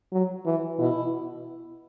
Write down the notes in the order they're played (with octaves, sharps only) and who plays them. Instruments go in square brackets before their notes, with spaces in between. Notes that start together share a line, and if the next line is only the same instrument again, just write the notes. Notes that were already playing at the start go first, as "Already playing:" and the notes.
[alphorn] F#3
E3
[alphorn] B2 [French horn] E4